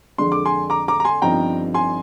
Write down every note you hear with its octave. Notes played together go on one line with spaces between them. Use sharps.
F2 D3 G#3 D4 C6
D6
G#5 C6
A#5 D6
A#5 D6
A#5
G#5 C6
G1 G2 F3 C4 D#4 G5 A#5
G#5 C6